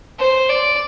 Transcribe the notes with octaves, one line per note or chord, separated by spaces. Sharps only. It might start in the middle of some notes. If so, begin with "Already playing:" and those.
C5
D5